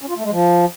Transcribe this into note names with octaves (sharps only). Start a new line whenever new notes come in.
C#4
F4
A3
G#3
F3